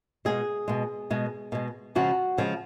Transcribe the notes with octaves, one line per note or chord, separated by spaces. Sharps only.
B2 G#3 G#4
B2 G#3
B2 G#3
B2 G#3
C#3 F3 G#3 F#4
C#3 F3 G#3